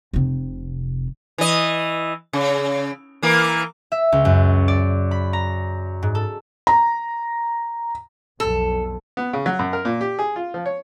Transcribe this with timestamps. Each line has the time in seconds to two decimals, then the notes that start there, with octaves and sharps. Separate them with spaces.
0.14 F1 C3
1.38 E3 D#5
2.33 C#3
3.23 E3 A#3
3.92 E5
4.12 C#2
4.25 F#2
4.68 D5
5.11 B5
5.33 A#5
6.03 G#2
6.15 A4
6.67 A#5
8.40 B1 F2 A4
9.17 B3
9.33 C#3
9.46 F#3
9.59 F#2
9.73 A#4
9.85 A#2
10.01 G4
10.19 G#4
10.36 F4
10.54 F3
10.66 C#5